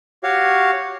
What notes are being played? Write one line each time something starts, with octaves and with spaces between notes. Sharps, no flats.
F#4 G4 C#5 F5